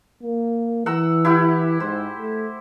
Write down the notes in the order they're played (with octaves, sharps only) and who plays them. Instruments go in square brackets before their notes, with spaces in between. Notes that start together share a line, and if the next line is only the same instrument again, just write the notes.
[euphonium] A#3
[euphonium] E3 [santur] F#5 A#5 E6
[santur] E4 G4 F#5
[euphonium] G#2 [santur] C5
[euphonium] A3